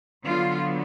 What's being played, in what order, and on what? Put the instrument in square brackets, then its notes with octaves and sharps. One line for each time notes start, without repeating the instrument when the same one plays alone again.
[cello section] D3 F#3 B3 F4